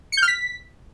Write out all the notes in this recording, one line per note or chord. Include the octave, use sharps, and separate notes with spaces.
C#7
G6
F6
B6